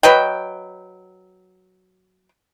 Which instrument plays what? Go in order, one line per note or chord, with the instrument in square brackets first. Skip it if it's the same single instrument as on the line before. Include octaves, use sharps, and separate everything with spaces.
[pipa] F#3 B4 D#5 G5